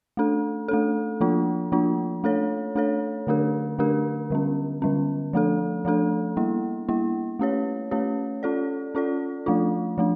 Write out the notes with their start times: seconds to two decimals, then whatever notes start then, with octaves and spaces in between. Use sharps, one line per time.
0.17 A3 D4 A4
0.68 A3 D4 A4
1.21 F3 A#3 D4 F4
1.72 F3 A#3 D4 F4
2.24 A3 D4 A4 C#5
2.75 A3 D4 A4 C#5
3.27 D3 A3 D4 G4 A#4
3.79 D3 A3 D4 G4 A#4
4.30 D3 G3 C#4
4.82 D3 G3 C#4
5.33 F3 A3 D4 A4
5.85 F3 A3 D4 A4
6.37 G3 A#3 E4
6.89 G3 A#3 E4
7.39 A3 C#4 G4 C#5
7.91 A3 C#4 G4 C#5
8.43 C#4 F4 A4 D5
8.95 C#4 F4 A4 D5
9.46 F3 A3 D4 F4
9.98 F3 A3 D4